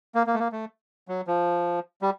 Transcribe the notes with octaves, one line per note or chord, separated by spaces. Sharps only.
A#3
A#3
A3
A#3
A3
F#3
F3
G3